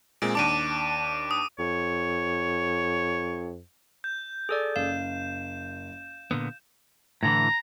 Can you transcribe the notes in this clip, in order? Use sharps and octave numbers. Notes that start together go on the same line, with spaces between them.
A#2 G#3 C4 D7
D#2 D4 A5 D6 D7 D#7
D#6
F2 C#5
G6
G#4 A4 D5
F#1 F5 E7
A#2 D3 B3
A2 D3 E3 A#5